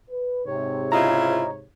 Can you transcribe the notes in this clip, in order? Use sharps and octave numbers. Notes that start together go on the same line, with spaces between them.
B4
G#2 C3 C#5
C#3 E4 F4 D#5 A#5